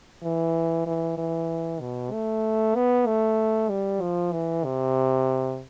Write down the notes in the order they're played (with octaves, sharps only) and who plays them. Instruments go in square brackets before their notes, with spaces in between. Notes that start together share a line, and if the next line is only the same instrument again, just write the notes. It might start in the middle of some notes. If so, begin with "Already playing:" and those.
[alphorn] E3
E3
E3
B2
A3
B3
A3
G3
F3
E3
C3